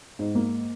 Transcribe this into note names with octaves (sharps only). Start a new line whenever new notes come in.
G#2
A#3